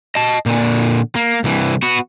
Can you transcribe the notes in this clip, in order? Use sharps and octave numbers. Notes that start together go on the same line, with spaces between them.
D#5 A5
A#2 D3
A#3
C2 E3
B3 F#4